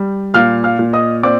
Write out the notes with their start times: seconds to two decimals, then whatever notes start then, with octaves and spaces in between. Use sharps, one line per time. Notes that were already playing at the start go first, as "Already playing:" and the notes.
Already playing: G3
0.34 A#2 F5 F6
0.64 F5 F6
0.79 A#2
0.93 D#5 D#6
1.23 C4 D5 D6